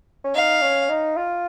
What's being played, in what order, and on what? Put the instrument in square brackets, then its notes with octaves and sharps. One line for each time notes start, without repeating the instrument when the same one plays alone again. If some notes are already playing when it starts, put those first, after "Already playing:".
[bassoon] C#4
[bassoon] D#4 [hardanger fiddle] F5
[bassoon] C#4
D#4
F4